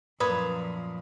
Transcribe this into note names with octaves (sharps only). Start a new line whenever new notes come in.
F#2 A#2 F3 B4 B5 D#6 G#6